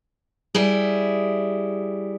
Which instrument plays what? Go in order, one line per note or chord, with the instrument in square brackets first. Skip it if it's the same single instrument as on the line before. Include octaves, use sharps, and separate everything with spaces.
[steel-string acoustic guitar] G3 E4 G#4